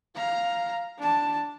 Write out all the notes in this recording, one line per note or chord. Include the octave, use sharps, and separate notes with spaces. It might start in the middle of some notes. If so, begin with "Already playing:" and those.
F5 A#5
D4 A5